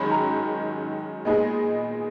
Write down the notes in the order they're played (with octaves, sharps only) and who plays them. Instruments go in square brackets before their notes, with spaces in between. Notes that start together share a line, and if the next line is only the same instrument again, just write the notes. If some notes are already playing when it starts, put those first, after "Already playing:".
Already playing: [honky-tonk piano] G#2 D#3 F#3 C#4 [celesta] B5
[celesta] A#5
[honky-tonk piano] A#2 G#3 B3 D#4 G#4